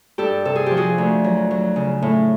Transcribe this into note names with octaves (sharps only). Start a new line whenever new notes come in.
G2 G4 A4
C3 A4
G#4
F3 G4
F#4 G#4
D2
F#3
F#3
C#3
A2